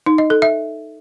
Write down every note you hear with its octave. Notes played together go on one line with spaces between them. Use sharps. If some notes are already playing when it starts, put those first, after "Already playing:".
D#4
D#5
A4
E5